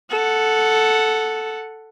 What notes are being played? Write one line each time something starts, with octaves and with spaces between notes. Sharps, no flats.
A4 F#5